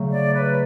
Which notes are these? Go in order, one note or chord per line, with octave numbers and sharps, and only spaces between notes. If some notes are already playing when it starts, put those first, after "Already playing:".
Already playing: C#3 F#3 A3
D5
C#5
B4